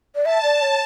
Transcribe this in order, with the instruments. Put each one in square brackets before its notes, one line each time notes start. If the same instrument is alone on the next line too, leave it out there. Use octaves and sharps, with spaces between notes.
[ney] D5
[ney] E5 [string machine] A5
[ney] D5
C#5